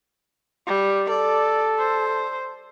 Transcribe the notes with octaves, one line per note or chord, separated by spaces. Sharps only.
G3
A4 D5
C5